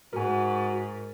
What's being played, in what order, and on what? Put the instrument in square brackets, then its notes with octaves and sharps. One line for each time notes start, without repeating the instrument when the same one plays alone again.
[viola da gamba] G#2 [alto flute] F#4 [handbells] A#4 G#5